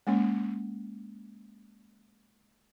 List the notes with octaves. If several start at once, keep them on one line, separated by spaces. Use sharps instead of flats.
G#3 A#3 C#4